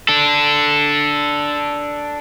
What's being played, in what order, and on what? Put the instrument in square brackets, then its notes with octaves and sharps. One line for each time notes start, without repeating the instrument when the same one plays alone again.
[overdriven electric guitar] D4 A4